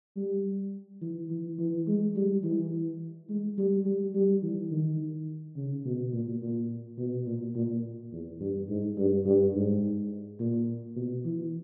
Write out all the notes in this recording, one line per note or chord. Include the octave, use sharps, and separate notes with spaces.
G3
E3
E3
E3
G#3
G3
E3
G#3
G3
G3
G3
E3
D#3
C#3
B2
A#2
A#2
B2
A#2
A#2
E2
G2
G#2
G2
G2
G#2
A#2
B2
E3